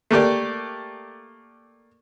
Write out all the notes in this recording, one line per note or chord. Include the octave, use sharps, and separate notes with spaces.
A3 A#3 G4 D5